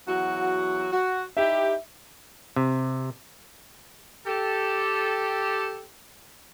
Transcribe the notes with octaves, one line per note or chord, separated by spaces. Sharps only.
E2 F#3 F#4
F#4
D#4 E4 G4 E5
C3
G4 A4